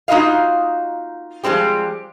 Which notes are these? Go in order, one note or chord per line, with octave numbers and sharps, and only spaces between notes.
A#3 D#4 F4 F#4 D#5 F5
F3 G3 G#3 C4 G4